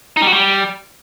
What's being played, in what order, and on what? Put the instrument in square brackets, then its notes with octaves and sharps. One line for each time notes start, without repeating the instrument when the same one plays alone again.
[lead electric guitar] D#4
G3
F#4
G3